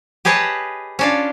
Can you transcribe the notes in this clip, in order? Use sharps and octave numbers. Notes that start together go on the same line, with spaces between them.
G4 G#4 B4 C#5 D#5 A5
C#4 D4 F4